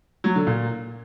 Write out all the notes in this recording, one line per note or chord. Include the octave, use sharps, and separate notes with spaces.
F#3
D3
A#2